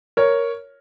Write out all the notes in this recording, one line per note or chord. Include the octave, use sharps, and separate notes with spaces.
A#4 C#5